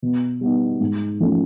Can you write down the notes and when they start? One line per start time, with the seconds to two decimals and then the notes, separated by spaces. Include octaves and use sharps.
0.02 B2
0.41 G3 B3 D#4
0.80 G#2
1.20 F3 A3 C#4